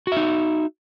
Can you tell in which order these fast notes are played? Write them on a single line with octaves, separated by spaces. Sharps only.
F#4 E5 D#4